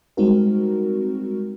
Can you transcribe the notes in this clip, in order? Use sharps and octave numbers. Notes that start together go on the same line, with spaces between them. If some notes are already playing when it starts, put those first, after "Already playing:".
G3 G#3 C4 D#4 F#4 A#4